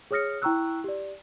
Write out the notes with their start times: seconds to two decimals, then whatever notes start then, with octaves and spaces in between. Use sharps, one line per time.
0.11 G#4 C#5 D#6 F6 A#6 C#7
0.42 E4 G5 A#5 C#6 E6 F#6
0.84 G4 D5